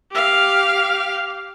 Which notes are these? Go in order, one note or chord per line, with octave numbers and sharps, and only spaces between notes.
G4 F5